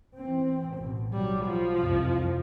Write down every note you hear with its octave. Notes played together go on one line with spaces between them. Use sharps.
E3 C4
A1 B2
B1 F#3 G3
F3
C2 F2